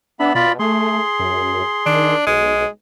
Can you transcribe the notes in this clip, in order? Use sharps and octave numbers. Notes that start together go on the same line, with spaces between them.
B3 D4 E5 B5
B2 F4 D5 B5
A3 G#4 C6
F#2
D#3 D4
B1 G#3